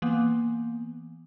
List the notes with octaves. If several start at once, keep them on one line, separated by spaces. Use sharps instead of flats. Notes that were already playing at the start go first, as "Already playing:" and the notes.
E3 A#3 B3